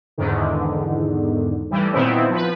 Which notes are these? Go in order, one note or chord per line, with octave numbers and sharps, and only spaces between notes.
E2 G#2 D3 D#3
A2 E3 G3
A#2 D#3 B3 C4 E4
F3 B4